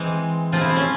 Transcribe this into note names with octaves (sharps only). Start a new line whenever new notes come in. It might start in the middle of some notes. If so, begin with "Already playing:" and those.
Already playing: E3 G#3 C4
C3 F3 C4 F4
E4
C4
C#4